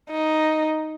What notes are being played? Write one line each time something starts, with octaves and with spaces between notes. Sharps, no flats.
D#4